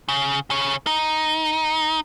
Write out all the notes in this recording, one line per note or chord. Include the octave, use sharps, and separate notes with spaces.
C#3
C#3 C#5
D#4